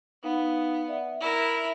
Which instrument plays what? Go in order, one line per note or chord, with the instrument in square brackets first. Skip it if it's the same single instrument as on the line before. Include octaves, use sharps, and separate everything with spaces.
[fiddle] B3 [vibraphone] D#4 F5 F#5
[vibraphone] D5 E5 F#5
[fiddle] E4 A#4 [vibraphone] E5